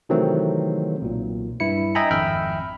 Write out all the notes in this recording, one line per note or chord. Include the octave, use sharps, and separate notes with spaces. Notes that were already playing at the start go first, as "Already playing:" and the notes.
C3 D#3 E3 F#3 A3 C4
B1 A#2
G2 E4 C#7
D#5 E5 G5 G#5 A#5 B5
G#1 F2 E5 G5 B5 F6